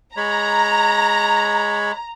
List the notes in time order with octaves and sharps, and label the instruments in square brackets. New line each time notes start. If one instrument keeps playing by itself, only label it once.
[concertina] G#3 C#5 B5 [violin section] A#5